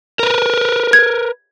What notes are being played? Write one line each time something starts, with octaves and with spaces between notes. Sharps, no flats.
A#4 B4
G#6